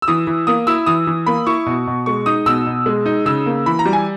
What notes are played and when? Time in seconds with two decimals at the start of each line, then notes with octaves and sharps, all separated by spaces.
0.02 E6
0.08 E3 D#6
0.27 E3
0.47 A#3 D#6
0.67 E4 E6
0.86 E3 D#6
1.07 E3
1.26 A#3 B5
1.47 E4 C#6
1.66 B2
1.87 B2
2.06 G#3 C#6
2.26 D#4 D#6
2.46 B2 E6
2.66 B2
2.86 G#3
3.06 D#4
3.26 C#3 E6
3.46 A#3
3.66 E3 B5
3.79 A#5
3.86 G3
3.93 G#5